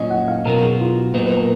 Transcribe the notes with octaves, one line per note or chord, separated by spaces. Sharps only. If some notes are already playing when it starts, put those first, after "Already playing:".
Already playing: A#2 F#3 C#4 D#5
F#5
F5
B2 F#3 B3 A#4
G#4
F4
F#4
A#2 F#3 B3 D#4 B4
B4
A#4